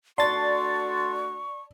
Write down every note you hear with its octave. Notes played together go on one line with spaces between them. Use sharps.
A3 D4 F#4 D5 A5 C6 C#6 A6